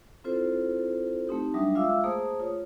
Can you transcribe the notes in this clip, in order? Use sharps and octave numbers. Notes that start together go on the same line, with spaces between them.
C4 E4 F4 A4 C5
A3 C4 D#4 G4
F#3 G3 D4 E5 D#6
G#3 F4 E5 F5 D6 E6
A3 A#3 G#4 C5 D#6
F4 C#5